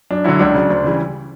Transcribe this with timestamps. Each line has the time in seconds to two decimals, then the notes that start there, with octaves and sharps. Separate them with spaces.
0.11 F#2 D4
0.24 D3 F#3 E4
0.39 C#2 D4
0.54 C#3 F#3
0.70 D2
0.84 C#3 E3 G3